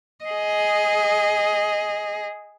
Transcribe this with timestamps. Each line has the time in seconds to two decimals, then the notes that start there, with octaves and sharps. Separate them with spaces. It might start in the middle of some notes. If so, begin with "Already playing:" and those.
0.24 G#4 D#5